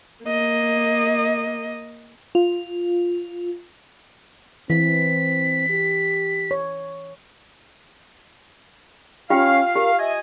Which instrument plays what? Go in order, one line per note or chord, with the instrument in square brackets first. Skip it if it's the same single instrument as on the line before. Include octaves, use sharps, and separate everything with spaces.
[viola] A#3 D#5
[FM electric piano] F4
[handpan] E3 [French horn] C4 [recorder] B6
[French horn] G4
[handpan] C#5
[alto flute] C#4 [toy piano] F4 G4 G5 [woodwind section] F5
[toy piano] G4 [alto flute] A#4
[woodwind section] D#5 G#5 [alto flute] E5